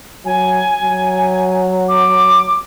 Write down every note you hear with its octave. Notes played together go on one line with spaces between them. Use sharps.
F#3 G#5
F#3
D6